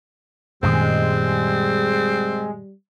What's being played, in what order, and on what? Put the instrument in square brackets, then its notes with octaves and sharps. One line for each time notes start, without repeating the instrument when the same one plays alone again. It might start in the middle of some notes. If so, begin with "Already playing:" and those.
[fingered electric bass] F#2 A#2 D#3 [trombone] G3 [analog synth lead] G#3 [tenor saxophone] C4